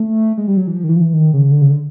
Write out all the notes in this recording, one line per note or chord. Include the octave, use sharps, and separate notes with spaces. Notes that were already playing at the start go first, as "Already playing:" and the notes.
Already playing: A3
G#3
G3
F#3
E3
F3
D#3
E3
F3
E3
D#3
C#3
D3
C#3
D3